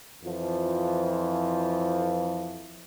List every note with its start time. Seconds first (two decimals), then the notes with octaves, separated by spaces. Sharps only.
0.24 F2 E3 F3